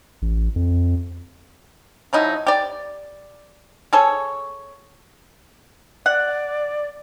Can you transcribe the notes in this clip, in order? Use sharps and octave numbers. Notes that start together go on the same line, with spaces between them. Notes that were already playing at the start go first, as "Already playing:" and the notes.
A1
F2
F3 F#3 D#4 E4
G4 D5
G#4 A4 C#5
D5 F#5